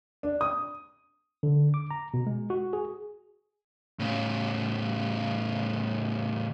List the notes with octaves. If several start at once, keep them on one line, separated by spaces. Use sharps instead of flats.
D4
D#6
D3
D6
A#5
B2
G#3
F#4
G#4
A2 C#3